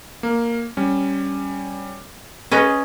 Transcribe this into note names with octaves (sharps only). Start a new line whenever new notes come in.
A#3
G3 C#4
C#4 G#4 B4 D#5